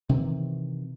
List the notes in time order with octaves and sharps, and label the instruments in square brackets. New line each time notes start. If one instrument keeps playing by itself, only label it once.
[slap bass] C3 D#3 E3